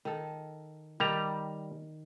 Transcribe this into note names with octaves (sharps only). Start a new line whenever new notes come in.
D#3 A4
D#3 G3 A#5